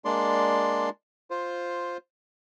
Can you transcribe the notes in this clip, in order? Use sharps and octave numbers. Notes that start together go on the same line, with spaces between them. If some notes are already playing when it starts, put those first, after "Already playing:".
G#3 A#3 D4 D5 C6
F4 C5